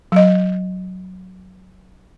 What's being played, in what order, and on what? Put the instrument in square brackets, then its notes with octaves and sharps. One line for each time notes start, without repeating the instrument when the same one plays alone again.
[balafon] F#3 D#5